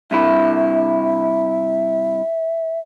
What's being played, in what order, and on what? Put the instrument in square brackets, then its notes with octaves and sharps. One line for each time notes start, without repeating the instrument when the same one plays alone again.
[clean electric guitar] G2 C3 E4 [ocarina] E5